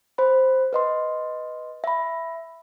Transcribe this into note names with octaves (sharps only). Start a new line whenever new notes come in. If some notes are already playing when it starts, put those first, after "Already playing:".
C5 B5
B4 D#5 C6
E5 B5